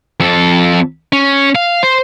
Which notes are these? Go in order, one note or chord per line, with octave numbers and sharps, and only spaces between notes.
F2 A4
C#4
F5
C5